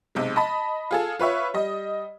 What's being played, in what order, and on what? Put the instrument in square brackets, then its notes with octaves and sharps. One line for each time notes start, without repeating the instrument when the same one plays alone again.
[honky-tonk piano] B1 C3 G#3
D#5 A5 B5
F4 G#4 A4
F4 B4 C#5 E5
G3 D#5